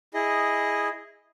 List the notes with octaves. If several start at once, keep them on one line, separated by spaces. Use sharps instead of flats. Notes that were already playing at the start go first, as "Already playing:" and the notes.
E4 G#4 D#5